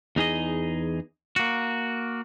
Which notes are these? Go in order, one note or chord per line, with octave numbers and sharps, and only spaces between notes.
E2 D#4 G#4 D#5
A#3 F#4